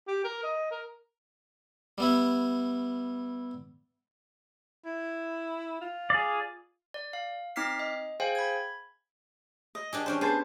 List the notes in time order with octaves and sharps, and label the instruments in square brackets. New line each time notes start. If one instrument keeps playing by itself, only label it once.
[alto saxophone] G4
A#4
D#5
A#4
[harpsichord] G3 B3 E4
[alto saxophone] E4
F4
[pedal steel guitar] G#4 D5
[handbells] D5
F5
C4 D#4 D6 F6 B6 C7
D#5
G#4 C5 F5 G5 G#5
B5 G#6
[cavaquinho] D#5
[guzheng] D4 G4 G#4
C#4 D4 C5
[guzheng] B3 [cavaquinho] G#4 C5 A5